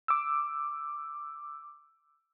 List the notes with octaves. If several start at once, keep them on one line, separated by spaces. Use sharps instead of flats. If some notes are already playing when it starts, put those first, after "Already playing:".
D6 E6